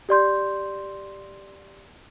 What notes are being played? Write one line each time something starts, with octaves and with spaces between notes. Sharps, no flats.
G4 D5 C6 G6